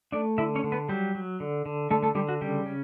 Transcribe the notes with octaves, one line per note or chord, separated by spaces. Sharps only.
A3 D4 D5
D3 E4 E5
C#4 C#5
D3
B3 B4
F#3 G3 G4
F#3
D3
D3
D3 A3 A4
A3 A4
D3 G3 G4
F#4
C#3 G3 G4
C#4